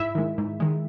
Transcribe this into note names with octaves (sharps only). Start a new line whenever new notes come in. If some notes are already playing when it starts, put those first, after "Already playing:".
Already playing: G#2 E4 E5
D#3 G#3
G#2
D#3 G#3